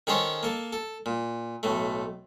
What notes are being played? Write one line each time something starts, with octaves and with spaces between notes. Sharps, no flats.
D#3 C#4 G#4 A4 C5 C#5
A#3 A4
A4
A#2
B1 A2 A3